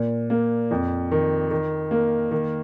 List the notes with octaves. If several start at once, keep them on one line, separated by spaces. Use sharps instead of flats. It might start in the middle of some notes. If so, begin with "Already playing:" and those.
Already playing: A#2
A#3
F2
D#3
D#3
A#3
D#3